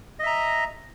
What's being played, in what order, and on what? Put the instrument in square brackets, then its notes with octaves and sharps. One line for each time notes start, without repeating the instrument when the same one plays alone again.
[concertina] D#5
E5
A#5